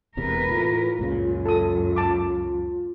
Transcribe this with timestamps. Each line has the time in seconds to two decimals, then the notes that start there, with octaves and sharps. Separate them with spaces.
0.17 E1 E2 C3 A#4 B4
0.48 A2 E3 F4
0.99 C#2 F#2 A#2 C#3
1.46 A4 D#6
1.96 A5 D6